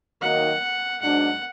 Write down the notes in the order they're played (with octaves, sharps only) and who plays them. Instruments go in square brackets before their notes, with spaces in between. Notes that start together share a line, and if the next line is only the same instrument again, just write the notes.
[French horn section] D#3 F#3 A#3 D#4 [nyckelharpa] F#5
[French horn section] G#2 F#3 D4 [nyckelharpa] F#5